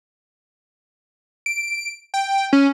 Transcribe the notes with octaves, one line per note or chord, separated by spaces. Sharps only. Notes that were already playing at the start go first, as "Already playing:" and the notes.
D7
G5
C#4